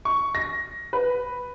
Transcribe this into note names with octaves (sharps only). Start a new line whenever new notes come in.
C#6
A#6
B4